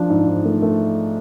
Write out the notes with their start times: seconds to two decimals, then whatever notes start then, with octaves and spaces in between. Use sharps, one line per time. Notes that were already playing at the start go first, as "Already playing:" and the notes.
Already playing: F3 D4
0.10 G#2
0.27 G#2
0.45 A3
0.62 A3